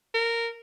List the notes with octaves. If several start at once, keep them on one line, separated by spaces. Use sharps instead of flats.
A#4